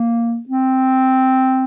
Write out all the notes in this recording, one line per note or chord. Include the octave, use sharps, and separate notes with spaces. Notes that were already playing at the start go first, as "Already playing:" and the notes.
Already playing: A#3
C4